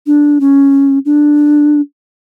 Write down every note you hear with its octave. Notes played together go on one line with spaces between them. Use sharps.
D4
C#4
D4